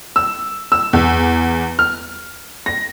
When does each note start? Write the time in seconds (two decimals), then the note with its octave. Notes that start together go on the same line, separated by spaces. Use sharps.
0.16 E6
0.72 E6
0.93 E2
1.79 F6
2.66 A#6